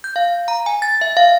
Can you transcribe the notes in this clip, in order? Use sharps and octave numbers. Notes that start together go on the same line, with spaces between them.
G6
F5
A#5
G#5
A6
E5
F5